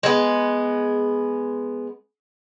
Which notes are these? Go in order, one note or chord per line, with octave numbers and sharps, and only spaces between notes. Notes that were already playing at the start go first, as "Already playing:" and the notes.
G#3 B3